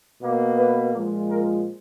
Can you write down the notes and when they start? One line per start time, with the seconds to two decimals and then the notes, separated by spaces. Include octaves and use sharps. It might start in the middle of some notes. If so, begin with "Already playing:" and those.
0.21 B2 A#3
0.57 B4
0.94 A#2 F3 G#3
1.30 A#4